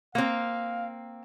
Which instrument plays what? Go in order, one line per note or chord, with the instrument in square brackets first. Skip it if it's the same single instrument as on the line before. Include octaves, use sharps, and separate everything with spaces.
[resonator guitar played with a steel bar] A#3 C4 [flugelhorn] F5